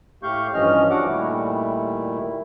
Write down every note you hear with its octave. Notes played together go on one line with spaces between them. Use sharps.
A2 A3 G4 F5 C#6 G6
G2 E3 F3 C#4 D#5 F6
D4 F#4 F#5 D6
A#2 D#3 G3 A3 E4